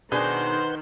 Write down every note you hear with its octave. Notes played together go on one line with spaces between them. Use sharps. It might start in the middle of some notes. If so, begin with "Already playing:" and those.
B2 D#3 D4 G#4 B4 C5 F#5 G6